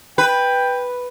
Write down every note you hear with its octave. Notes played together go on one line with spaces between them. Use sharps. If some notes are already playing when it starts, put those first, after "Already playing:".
B4 G5